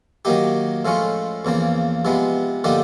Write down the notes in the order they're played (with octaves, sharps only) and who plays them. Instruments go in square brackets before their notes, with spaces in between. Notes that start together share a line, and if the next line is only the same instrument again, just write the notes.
[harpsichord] D#3 F#3 A#3 D#4 G4
A2 F3 G#3 C#4 F4
E2 C#3 F3 A#3
C3 F3 G#3 B3
D3 F3 A#3 D#4 G4